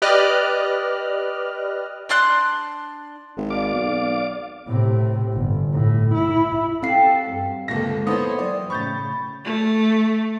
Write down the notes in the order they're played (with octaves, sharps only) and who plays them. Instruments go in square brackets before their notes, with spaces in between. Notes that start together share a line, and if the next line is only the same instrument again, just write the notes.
[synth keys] G4 B4 D5 D#5 F6 F#6
[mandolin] D4 D5 C6 F#6
[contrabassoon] G#1
[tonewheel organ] D5 F5 D6
[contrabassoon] B1
[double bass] A2 C3
G1
A2
E4
[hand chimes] C4 F5 C7 [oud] C#4 F#4 G4 [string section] A4
[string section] G2
[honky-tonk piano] G1 C#2 A#6 [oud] F3 [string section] G#3 A#3 A4
[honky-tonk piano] B3 E4 A4 [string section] C5 C#5 [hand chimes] D#6
[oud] D#3 E3 C5 [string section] F#3 [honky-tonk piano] D5
[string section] A2 C#3 [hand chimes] B5 [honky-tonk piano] C#6 G6 A6
[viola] A3